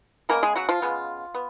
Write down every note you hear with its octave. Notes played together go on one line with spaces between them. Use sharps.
C#3 G#3 A#3 B3 A#4
G#3 G#4
F#3 F#4
F3 F4
C#3 G#3 B3
B3